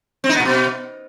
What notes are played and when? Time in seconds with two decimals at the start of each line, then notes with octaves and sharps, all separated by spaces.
0.24 C4
0.29 D#4
0.35 B3
0.40 A#2
0.45 B2